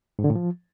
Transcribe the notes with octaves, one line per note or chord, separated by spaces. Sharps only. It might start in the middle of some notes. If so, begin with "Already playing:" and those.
G#2
D3
A2
F3